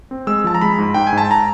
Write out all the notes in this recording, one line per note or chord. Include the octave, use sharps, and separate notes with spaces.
C4
G#3 E6
F3 A5
A#5
G#3 B5
G#2
G#2 G5
G#5
G#2
A5
A#5